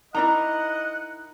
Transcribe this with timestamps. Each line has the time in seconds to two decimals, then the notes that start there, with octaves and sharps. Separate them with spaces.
0.15 D#4 E4 A#4 D5 D#5 F#5 A#5